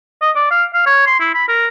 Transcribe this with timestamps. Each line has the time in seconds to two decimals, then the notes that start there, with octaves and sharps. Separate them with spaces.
0.22 D#5
0.36 D5
0.51 F5
0.74 F5
0.86 C#5
1.06 C6
1.20 E4
1.34 B5
1.48 A#4